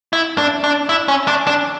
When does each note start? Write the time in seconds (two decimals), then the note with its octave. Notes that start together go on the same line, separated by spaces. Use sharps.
0.13 E4
0.38 D4
0.64 D4
0.89 E4
1.08 C#4
1.28 D4
1.47 D4